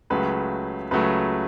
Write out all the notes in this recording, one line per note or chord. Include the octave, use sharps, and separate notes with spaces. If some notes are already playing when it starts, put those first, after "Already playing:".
C#2 C#3 F#3 A3 B4
C#2 C#3 F#3 A3 B4